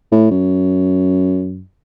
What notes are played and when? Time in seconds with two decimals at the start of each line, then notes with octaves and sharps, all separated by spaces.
0.12 A2
0.31 F#2